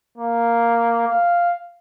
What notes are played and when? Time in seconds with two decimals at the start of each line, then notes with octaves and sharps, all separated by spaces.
0.18 A#3
1.08 F5